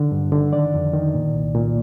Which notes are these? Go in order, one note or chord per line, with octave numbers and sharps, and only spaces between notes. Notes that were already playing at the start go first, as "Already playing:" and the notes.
Already playing: D3
G2
D3
D#3 D5
F2
D#3
A#2
C2
A#2